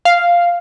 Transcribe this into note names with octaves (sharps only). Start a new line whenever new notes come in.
F5